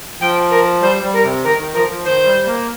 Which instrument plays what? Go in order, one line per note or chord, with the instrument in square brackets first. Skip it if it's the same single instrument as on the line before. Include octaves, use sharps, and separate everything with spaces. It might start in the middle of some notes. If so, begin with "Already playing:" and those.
[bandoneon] F3 [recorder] G5
[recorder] A#4
[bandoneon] G3 [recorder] C5
[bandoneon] G3
[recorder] A#4
[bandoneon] C3
[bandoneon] D#3 [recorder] A#4
[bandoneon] D#3
[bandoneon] F3 [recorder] A#4
[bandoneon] F3
[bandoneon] D#3 [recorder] C5
[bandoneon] G3
A#3